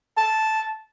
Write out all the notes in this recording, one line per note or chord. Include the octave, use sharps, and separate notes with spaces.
A5